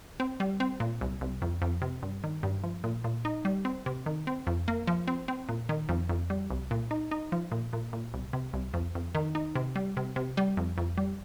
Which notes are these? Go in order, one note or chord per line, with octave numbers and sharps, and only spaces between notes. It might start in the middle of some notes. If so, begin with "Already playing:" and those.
C4
G3
C4
A#2
C2
C2
F2
F2
C3
G2
D#3
G2
F3
A#2
A#2
D#4
G3
C4
C3
D#3
C4
F2
A#3
F3
C4
C4
A#2
D#3
F2
F2
G3
C2
A#2
D#4
D#4
F3
A#2
A#2
A#2
C2
C3
C2
F2
F2
D#3
D#4
C3
G3
C3
C3
G3
F2
F2
G3